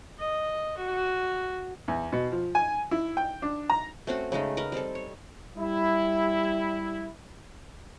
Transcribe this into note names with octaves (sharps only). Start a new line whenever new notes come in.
D#5
F#4
E2
B2
F3
G#5
E4
G5
D4
A#5
A3 C4 C#4 F#4
C#3 G#3 A3 D#4
A#4 B4 D#5
G3 C4 D#4 A4
C#5
G3 E4